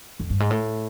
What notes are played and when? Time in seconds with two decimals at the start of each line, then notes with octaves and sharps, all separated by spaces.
0.20 F2
0.30 G2
0.40 G#2
0.51 A2